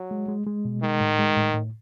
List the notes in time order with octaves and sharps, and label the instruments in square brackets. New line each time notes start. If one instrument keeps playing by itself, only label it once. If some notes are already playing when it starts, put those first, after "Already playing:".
Already playing: [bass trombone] F#3
[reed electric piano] G#3
G#3
G#3
B2
[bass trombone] D#3 [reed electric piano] G#3
[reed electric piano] A2
G#3
A2
A2